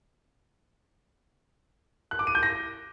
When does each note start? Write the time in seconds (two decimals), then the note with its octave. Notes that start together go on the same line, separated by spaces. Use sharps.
2.11 F#6
2.19 D6
2.27 D#7
2.35 G6
2.43 A#6